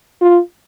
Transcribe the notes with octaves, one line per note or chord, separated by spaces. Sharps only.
F4